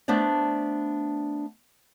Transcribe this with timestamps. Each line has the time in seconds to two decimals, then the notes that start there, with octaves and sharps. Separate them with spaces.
0.08 A3 B3 D4 C5 D5